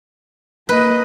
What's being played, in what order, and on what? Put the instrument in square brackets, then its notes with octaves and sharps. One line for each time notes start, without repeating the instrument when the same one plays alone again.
[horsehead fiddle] A#3 D#5 [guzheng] B4